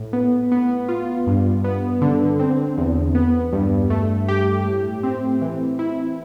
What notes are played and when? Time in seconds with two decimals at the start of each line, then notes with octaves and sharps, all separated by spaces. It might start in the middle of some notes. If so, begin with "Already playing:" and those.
Already playing: A2
0.13 B3
0.52 B3
0.88 F4
1.27 G2
1.64 B3
2.02 D3
2.39 C4
2.77 E2
3.15 B3
3.53 G2
3.90 A3
4.28 G4
4.65 A2
5.03 C4
5.42 E3
5.79 E4